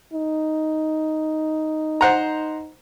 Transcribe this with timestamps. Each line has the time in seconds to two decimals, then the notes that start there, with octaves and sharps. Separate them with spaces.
0.14 D#4
2.01 C5 F#5 A#5